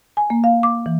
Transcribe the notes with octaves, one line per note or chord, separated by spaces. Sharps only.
G#5
A#3
F5
D6
E3